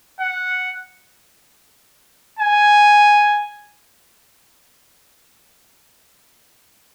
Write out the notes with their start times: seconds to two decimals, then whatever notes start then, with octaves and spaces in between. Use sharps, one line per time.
0.20 F#5
2.39 G#5